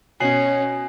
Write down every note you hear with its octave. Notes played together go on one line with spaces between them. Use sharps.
B2 C#4 C#5 G#5 C7 F#7